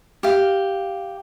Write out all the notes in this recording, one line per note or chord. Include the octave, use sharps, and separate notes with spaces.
G4 F5